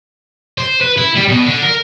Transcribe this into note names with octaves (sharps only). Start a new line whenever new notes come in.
C5
B4
E4
G3
B2
D3
A#4